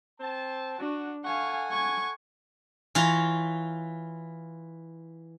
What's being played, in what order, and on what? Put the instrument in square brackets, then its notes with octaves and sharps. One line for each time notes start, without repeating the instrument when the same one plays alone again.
[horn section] C4 A5
[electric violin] D4 [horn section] F#4
[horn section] A4 F#5 G#5 [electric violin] F5 C#6
[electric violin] C#6 G#6
[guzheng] E3 F4 C#5 A#5